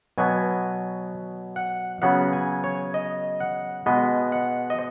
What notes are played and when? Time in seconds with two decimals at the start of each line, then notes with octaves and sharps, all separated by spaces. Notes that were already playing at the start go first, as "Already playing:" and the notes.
0.18 B2 F#3 B3 G#5
1.56 F#5
2.02 C#3 F#3 B3 F#5
2.33 G#5
2.64 C#5
2.94 D#5
3.40 F#5
3.86 B2 G#3 B3 D#5
4.32 F#5
4.70 D#5